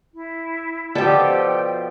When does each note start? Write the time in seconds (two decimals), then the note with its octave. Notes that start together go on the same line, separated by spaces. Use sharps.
0.14 E4
0.95 B2 F3 G4 A4 D5 G5